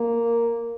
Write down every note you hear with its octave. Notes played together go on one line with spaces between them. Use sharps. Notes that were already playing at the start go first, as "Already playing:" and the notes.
Already playing: A#3